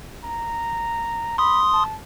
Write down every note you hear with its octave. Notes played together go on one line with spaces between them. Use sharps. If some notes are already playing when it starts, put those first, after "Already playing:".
A#5
B5 C6 D#6
A5